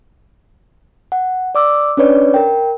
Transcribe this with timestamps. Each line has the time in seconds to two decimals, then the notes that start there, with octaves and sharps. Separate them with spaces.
1.12 F#5
1.55 D5 D6 E6
1.97 C#4 D4 B4 C#5 D5
2.34 A#4 G5